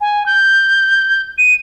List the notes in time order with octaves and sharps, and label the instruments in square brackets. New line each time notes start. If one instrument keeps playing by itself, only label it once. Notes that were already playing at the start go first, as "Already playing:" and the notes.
[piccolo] G#5
G6
D#7